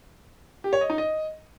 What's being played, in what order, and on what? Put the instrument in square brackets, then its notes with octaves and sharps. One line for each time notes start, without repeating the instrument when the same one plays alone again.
[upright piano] G4
C#5
D#5
D#4
D#5